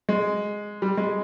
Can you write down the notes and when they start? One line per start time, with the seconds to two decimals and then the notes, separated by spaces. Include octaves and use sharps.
0.09 G#3
0.82 G3
0.97 G#3